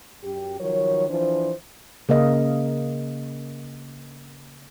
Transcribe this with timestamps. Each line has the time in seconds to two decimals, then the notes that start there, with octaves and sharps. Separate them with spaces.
0.23 F#2 G4
0.59 D#3 F3 F#3 A#4 C#5
1.09 E3 F3 D4 C5
2.09 C#3 A#3 A#4 D#5 F5